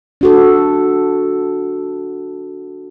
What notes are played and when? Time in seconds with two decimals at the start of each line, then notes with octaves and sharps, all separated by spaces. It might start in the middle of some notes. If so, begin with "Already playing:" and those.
0.21 D4 F#4 A4